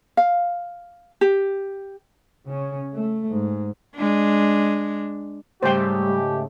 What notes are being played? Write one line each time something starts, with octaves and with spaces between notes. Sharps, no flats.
F5
G4
C#3 C#4
A3
G#2
G#3 D4
G#2 C#3 G3 A3 G4 C5 G5